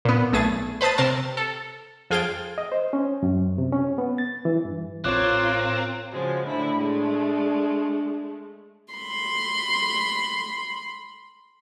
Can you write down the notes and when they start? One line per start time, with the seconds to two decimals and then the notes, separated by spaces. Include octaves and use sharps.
0.05 A#2 B3
0.33 B1 A3 G#4 A6
0.81 B4 C5 A5 D#6 A6
0.98 C3 A#4 A5 C6
1.37 A4
2.10 F2 F4 G#4 G5 A6 D7
2.58 D#5
2.72 C5
2.93 C#4
3.23 F#2
3.58 C3
3.72 C#4
3.98 B3
4.18 A6
4.45 E3
4.65 G2
5.04 A1 C4 F4 A#4 C#5 D6 F#6
6.12 C#3 F3 G#3 F#4 C5
6.46 A2 D3 D4 E4
6.77 G#3 A3
8.93 B5 C6